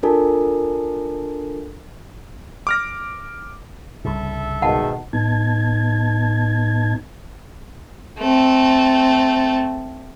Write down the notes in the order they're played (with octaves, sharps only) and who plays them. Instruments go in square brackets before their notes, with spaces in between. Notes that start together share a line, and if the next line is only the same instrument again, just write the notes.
[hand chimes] D4 F4 A4 A#4 G#5 A5
[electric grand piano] D6 F6 A#6
[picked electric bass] C2 G2 C#3 [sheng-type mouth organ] A4 E5
[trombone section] G#2 B2 D#3 [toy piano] F#5 A5
[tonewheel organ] A2 B3 D#4 A5 G#6
[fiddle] A3 C4